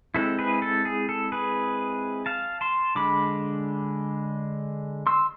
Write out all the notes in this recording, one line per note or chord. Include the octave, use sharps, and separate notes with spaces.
G#3 C4 E4 A4
G#4 B4
A4
G#4
A4
G#4 B4
F5 A5
A5 C6
D3 G#3 D4 B5 D6
C6 E6